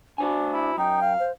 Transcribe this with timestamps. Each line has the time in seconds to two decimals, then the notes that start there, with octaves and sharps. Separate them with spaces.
0.18 D4 F#4 C5 G#5
0.54 E4
0.78 F#2 D#4 G5
1.02 F5
1.19 C5